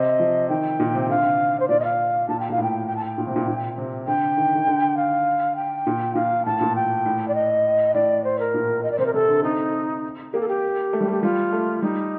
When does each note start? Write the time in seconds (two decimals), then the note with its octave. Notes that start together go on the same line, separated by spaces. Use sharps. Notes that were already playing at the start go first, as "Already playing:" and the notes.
Already playing: C3 D#5
0.20 F3
0.49 D#3 G5
0.80 A#2
0.95 C3
1.09 D3 F5
1.60 C5
1.69 A#2 D5
1.80 D#5
1.84 F5
2.29 A#2 A5
2.40 G5
2.49 A#2 F5
2.58 A2
2.63 G5
2.88 G5
2.97 A5
3.05 G5
3.18 A#2
3.27 C3
3.36 A#2
3.48 A#2
3.78 C3
4.07 D3 G5
4.37 D#3
4.55 D#3
4.67 D3
4.97 F5
5.56 G5
5.87 A#2
6.15 A#2 F5
6.45 A2 A5
6.61 A#2
6.76 G5
7.06 A2
7.28 D5
7.35 D#5
7.94 A2 D5
8.24 C5
8.40 A#4
8.54 A#2
8.83 D#5
8.91 D5
8.99 C3 C5
9.06 A#4
9.14 C3 A4
9.29 D3
9.44 C4 D#4
10.33 A#3 G4
10.41 A4
10.48 G4
10.93 A3
11.01 G3
11.08 A3 G4
11.22 G3 F4
11.52 A3
11.82 G3 D#4